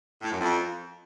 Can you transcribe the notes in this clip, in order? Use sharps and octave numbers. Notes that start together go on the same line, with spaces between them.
A2
F#2
F2